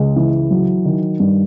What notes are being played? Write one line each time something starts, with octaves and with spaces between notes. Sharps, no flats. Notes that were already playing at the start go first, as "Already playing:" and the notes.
Already playing: C#2 G#3
E3
F#3
D#3
G2